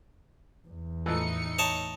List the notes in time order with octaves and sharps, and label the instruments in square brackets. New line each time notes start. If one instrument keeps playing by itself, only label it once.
[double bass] E2
[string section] A2 D#4 C#7 [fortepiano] E3 F3 A3
[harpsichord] C#5 D#5 A5